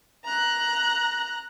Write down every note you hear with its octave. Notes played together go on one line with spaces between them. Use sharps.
A#5 F#6